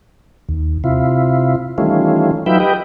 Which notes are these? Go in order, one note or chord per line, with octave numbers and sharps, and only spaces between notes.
D#2
C3 E4 F4
D#3 E3 G3 A3 C#4 F4
F#3 D#4 F4 B4 E5 G5
G4 B4 D#5 G5